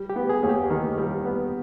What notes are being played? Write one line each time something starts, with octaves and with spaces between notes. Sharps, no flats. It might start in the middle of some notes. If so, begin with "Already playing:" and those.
Already playing: G3
G4
B3
G#4
D#2
G4
D#3
G3
B3